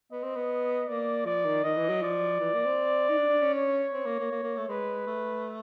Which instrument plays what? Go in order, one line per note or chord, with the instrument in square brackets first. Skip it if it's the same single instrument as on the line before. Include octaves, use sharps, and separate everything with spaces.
[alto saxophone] B3 [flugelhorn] D#5
[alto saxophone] C4
B3
[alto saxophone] A#3 [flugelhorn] D5
[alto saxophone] F3 [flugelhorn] D5
[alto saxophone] D#3
[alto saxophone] D#3 [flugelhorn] D#5
[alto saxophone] E3
F#3
[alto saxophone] F3 [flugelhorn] D5
[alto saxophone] E3
A#3
C4
D#4
D4
D4
C#4
[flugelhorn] C#5
[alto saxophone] C4
A#3
A#3
A#3
A#3
A3
[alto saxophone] G#3 [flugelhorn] B4
[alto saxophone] A3